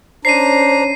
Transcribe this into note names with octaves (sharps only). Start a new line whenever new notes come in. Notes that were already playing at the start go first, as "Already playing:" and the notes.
C#4 D4 C5 A#5 C7 D#7